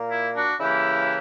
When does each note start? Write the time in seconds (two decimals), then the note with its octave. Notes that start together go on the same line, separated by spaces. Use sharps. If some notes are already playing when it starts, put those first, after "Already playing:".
Already playing: A#2 A#3
0.09 E4
0.34 D4 F#4
0.60 C#3 E3 A#3 E4 G4